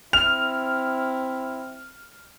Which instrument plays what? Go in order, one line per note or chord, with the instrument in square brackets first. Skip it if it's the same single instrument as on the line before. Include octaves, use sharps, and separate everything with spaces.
[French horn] C4 [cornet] E4 [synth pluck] F6 [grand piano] F7